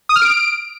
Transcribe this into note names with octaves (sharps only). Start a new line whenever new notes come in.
D#6
F6
D7